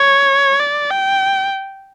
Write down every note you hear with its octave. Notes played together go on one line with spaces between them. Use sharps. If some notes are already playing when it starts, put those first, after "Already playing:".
Already playing: C#5
D5
G5